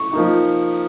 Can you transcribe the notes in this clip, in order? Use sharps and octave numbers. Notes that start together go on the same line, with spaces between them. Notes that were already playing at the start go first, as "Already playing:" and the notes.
Already playing: C#6
F3 A#3 D#4